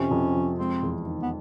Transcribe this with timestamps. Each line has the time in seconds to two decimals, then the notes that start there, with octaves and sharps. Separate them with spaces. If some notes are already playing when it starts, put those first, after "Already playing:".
Already playing: F2 C3 C#4
0.11 F2
0.35 F3
0.59 G#3 C4
0.82 E2
1.06 D#3
1.22 B3